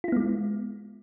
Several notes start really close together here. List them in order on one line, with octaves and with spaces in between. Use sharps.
F4 E4 B3 G#3